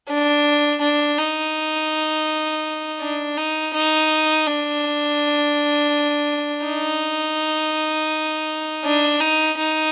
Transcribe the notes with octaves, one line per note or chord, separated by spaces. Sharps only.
D4
D4
D#4
D4
D#4
D#4
D4
D#4
D4
D#4
D#4